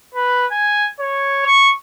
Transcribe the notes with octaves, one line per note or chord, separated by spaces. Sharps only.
B4
G#5
C#5
C#6